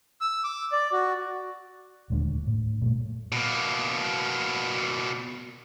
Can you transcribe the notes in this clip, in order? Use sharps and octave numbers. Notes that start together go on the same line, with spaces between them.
E6
D6
D5
F#4
D#1 D2 G#3 D4
A2
A#2 G3 A3
B2 A#3